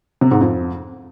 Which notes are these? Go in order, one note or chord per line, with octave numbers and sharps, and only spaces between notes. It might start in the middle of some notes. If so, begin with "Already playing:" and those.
C3
G#2
F2